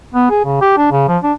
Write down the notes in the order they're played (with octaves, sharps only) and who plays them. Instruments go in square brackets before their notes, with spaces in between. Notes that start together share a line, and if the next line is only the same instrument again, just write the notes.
[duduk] B3
G#4
C#3
G4
D4
C#3
F3
D4